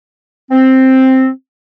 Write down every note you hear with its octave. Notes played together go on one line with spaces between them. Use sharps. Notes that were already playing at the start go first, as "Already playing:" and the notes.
C4